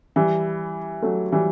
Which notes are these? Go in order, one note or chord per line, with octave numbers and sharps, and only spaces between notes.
E3 G3
F#3 A3
E3 G3